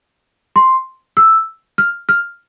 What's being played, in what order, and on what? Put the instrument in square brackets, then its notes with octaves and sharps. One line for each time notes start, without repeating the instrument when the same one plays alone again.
[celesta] C6
E6
F6
F6